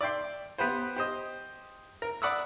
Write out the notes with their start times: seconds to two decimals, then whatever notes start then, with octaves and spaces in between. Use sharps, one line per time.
0.01 D5 E5 G5 C6
0.58 B3 G4 B4 C5
0.96 G4 C5 D#5
2.02 A#4
2.22 D5 F#5 B5 C#6 D#6 E6